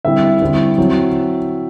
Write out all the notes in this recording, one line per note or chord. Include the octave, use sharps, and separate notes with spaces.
D3 G3 C4 E4 E5
D3 G3 C4 E4
F#3 C4 E4